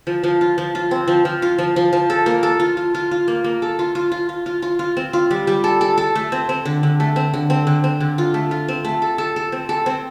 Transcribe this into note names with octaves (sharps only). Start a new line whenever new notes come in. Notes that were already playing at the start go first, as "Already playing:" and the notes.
F3
F3
F4
F3
F4
C4
F3
F3
F4
F3
F3
F3
A4
A#3
A4
F4
F4
F4
F4
A#3
A#3
A4
F4
F4
F4
F4
F4
F4
F4
C4
F4
G3
G3
A4
A4
A4
A3
C4
C4
D3
D3
A3
C4
D3
C4
D3
C4
D3
F4
A3
F4
C4
A3
A4
A4
A4
C4
A4
C4